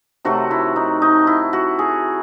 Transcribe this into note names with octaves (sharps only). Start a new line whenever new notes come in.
C3 D#3 F#3 A3 F#4
E4
D#4
D#4
E4
F#4
G#4